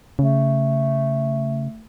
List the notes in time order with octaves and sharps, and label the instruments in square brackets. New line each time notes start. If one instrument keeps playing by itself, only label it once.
[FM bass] C#3 [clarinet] A3